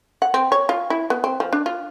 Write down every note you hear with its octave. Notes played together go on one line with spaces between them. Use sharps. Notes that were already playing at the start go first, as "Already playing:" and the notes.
F#5
C4
C#5
F4
E4
B3
C4
F3
D4
F4